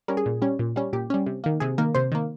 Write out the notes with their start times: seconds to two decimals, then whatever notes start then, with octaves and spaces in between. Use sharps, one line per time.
0.08 G3 C#4 A#4
0.17 G#4
0.26 A#2
0.42 G3 C#4
0.59 A#2
0.76 G3 C#4
0.93 A#2 G4
1.10 G3 C#4
1.26 C3
1.44 D#3 A#3
1.60 C3 G#4
1.78 D#3 A#3 A#4
1.95 C3 C5
2.12 D#3 A#3